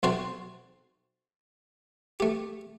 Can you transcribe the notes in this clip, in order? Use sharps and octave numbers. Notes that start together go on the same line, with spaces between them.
B1 C3 C4 F#4 C5 A5
A3 G4